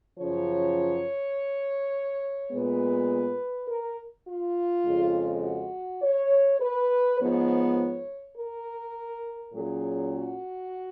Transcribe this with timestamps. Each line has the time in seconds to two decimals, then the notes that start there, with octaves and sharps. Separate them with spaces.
0.18 F#2 C#3 F3 C#5
2.51 A#2 G#3 B3 B4
3.68 A#4
4.26 F4
4.84 F2 C#3 G#3
5.43 F#4
6.02 C#5
6.60 B4
7.18 G#2 F3 B3 C#5
8.36 A#4
9.52 A#2 F#3 C#4 G#4
10.10 F#4